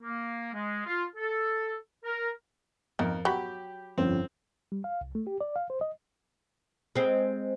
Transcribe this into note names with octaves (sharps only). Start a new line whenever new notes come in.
A#3
G#3
F4
A4
A#4
F2 D#3 A#4
F#3 G4 B5
G1 F2 C4 C#4
G3
F5
C2
A3
G4
D5
F5
C5
D#5
G#3 C4